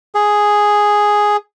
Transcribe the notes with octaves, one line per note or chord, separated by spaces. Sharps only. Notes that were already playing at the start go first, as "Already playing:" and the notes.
G#4